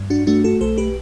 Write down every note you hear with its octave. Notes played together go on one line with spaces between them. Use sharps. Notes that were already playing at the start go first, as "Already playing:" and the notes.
Already playing: G2
D4 F#4
A3 D4 F#4
F#4 A4
B1 A4 C5
G4 B4